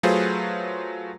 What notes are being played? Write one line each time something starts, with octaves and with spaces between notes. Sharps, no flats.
F#3 A3 F4 G#4 B4 C5